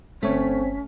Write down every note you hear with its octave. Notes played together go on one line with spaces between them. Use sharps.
G1 A3 C4 C#4 C#5 B6